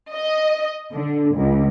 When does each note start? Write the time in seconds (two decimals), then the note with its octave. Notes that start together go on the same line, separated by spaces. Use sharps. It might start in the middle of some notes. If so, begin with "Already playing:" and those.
0.13 D#5
0.92 D3
1.36 C#2